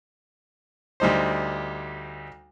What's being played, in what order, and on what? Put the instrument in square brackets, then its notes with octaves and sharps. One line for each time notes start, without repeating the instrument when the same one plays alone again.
[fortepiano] D2 G3 D#4 C5